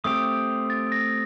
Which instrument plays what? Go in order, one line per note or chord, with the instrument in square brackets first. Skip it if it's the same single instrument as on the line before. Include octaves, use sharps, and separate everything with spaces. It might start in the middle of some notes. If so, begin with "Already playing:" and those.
[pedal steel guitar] A3 C4 G4 [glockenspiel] D#6
[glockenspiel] A6
A#6